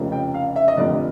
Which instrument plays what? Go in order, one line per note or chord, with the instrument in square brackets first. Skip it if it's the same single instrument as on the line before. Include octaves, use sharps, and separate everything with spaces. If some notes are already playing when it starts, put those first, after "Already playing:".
Already playing: [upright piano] F1 F2 C#3
G5
F5
E5
D#5
F1 F2 D3 D5